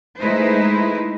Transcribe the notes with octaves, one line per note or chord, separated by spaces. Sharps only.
G#3 A3 D#4 E4 B4 C5